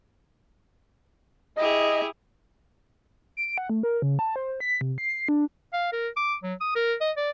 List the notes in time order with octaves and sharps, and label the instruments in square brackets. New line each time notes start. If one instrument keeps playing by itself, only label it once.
[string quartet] E4 G4 G#4 [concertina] D#5
[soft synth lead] D7
F#5
A3
A#4
C#3
A5
C5
B6
C3
C7
D4
[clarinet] F5
A#4
D6
F#3
D#6
A#4
D#5
D5